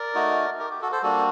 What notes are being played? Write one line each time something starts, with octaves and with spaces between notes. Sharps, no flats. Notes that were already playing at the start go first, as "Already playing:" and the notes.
Already playing: A#4 D5
A3 D#4 F#4
G4 A#4
G4
F#4 A4
A4 C5
G3 A#3 D4 F#4 A4